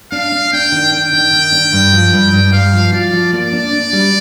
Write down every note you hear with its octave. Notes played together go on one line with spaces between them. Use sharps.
D4 F5
D4
D4 G5
D#3
D4 G5
D#3
D#3
D4
G2
F3
G2
G2
G2 F5
F3
F4 D5
F3
A#3 D5
D4
D4
G3